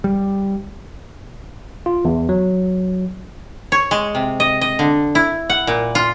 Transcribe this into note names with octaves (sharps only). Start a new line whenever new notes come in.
G3
F4
E2
F#3
C#5
G#3
C3
D#5
D#5
D3
E4
F#5
A#2
F4